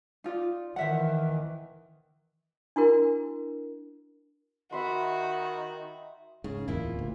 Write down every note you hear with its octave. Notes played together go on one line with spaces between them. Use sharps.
D#4 F4 D5
D#3 E3 C5 E5 F#5
D4 E4 F#4 A#4
D#3 F#4 E5 B5 C6
G#2 C#3
D1 E2 A#2 E4
D2